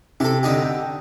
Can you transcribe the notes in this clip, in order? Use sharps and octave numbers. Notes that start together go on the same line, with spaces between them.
C3 G4 A4
D3 D#4 G4
G5